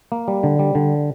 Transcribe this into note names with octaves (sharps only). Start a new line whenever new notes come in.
A#3
G3
D3
G3
D3